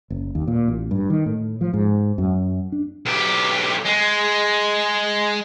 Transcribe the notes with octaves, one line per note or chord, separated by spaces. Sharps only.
F#1
D#2
A#2
A1
G2
D#3
A2
F3
G#2
F#2
D4
B1 G4
G#3